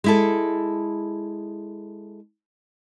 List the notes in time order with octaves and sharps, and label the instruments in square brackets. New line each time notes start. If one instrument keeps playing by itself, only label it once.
[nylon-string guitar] G#3 E4 A4